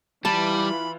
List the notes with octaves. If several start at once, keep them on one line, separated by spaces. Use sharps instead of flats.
E3 G3 F4 A5 B5